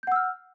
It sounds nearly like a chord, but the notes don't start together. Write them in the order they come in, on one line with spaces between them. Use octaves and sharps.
G6 F#5 E6 F6